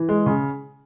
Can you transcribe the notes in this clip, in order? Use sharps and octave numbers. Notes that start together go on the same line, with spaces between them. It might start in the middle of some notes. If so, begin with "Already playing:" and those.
Already playing: E3
G#3
C#3